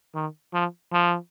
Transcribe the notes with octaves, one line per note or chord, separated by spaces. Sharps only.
D#3
F3
F3